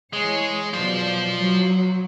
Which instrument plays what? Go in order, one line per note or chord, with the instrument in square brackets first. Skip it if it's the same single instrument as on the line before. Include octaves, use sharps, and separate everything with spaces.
[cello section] E3 G#4 C#5 [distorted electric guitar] G#3
[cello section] B2 F#3 D5 [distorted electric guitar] F4 C5
[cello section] F#3